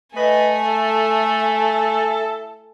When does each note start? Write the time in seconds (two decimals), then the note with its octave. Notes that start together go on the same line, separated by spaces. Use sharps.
0.16 A3 B4 D#5 G#5
0.66 E4 A4